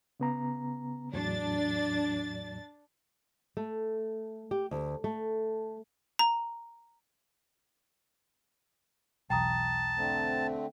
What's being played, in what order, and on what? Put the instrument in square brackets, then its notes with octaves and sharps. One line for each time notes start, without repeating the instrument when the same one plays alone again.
[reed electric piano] C#3 B3 A#5
[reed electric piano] E2 A2 F#3 [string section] D4 A6
[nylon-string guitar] A3
G4
D2
A3
[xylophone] A#5
[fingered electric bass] B1 E2 [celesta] G5 A#5 D#6 [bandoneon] A5
[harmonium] D3 A3 C4